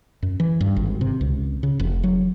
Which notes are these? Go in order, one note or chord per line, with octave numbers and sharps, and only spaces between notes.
F#2
E3
G2
G#1
C3
C#2
C#3
F1
F#3